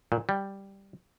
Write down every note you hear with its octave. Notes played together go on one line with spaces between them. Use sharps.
A#2
G3